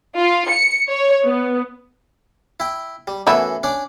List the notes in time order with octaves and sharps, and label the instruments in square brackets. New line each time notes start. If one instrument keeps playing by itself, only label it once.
[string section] F4
C#7
C#5
B3
[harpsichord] E4 G5
G3
[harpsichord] F#2 E3 A4 [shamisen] A3 B3 E4
[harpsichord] C#4 D4 D5